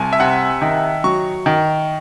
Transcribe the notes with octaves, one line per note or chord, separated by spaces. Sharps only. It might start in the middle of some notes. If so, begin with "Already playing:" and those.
Already playing: C2 G#5 A5
E5
C3 F#5
D#3
F#3 C#6
D#3